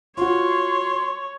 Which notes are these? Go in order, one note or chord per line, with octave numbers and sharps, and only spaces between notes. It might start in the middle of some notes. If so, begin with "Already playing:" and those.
F4 F#4 C#5 C6